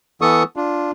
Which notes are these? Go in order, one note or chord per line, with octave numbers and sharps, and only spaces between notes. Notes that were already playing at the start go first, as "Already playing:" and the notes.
E3 B3 A4 C#6 D#6
D4 F4